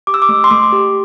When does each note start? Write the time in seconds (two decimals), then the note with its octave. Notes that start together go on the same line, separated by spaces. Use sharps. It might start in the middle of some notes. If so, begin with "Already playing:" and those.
0.07 G4 D6
0.14 E6
0.22 D6
0.29 A3
0.44 C6
0.51 A3 D6
0.72 G4